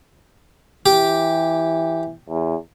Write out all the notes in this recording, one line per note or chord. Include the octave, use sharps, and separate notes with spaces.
E3 G4
E2